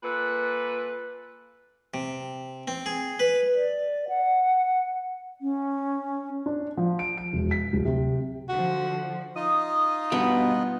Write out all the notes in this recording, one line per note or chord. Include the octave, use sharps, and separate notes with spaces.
A#2 A4 B4
C3
C4
G#4
B4
D5
F#5
C#4
D4
F3
D7
D7
E1
B6
D1
C3
D3 F3 F#4
D#4 F4 D#5 D#6
G2 B2 B3